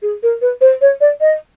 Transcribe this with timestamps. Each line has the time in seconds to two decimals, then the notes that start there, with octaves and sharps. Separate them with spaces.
0.02 G#4
0.23 A#4
0.42 B4
0.61 C5
0.81 C#5
1.01 D5
1.21 D#5